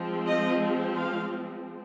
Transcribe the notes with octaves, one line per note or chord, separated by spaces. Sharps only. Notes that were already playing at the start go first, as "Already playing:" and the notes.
Already playing: F3 G#3 C4
D#5
F5